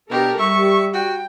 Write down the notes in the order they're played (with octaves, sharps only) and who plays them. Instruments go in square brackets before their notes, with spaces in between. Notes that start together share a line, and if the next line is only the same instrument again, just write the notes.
[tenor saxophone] B2 [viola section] D4 A4 A#4 [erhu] G4
[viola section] G3 [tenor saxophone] E5 [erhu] C#6
[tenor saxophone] F#4 [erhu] G5